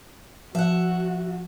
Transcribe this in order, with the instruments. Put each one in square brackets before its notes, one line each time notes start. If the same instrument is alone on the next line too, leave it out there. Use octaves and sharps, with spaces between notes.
[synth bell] F3 [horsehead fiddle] F#4 [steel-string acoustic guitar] E5 F#5